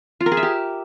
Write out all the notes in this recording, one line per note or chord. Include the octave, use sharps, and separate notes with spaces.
F4
A#4
G#4
E5
G4